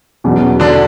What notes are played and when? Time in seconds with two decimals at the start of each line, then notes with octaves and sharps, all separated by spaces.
0.24 E2 B2 F#3 C#4 F#4
0.60 D3 D4